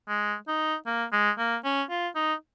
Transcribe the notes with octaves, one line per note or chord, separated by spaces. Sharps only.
G#3
D#4
A#3
G#3
A#3
C#4
F4
D#4